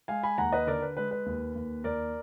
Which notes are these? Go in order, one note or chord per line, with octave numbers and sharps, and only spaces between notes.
G#3 F5 G#5
G#5 B5
D#2 F#5 A#5
B4 D#5
D3 A#4 D5
B4
G#3 B4
B4
D#2
D#2
D#2 A#4 D5